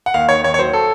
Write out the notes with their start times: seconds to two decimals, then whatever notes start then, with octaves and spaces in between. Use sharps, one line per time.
0.06 F#5
0.14 D#2 F5
0.29 D#3 C#5
0.44 D#2 C#5
0.54 C#5
0.59 F#3 C5
0.73 A4